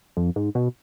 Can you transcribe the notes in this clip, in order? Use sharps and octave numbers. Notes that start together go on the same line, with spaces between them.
F2
G#2
B2